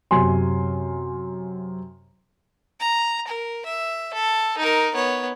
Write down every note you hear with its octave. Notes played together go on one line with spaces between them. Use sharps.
F#2 C3 G#5 C6
A#5
A#4
E5
A4
D#4 A#4
B3 C#5